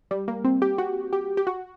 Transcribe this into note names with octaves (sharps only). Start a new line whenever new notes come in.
G3
A#3
C4
G4
F#4
G4
G4
F#4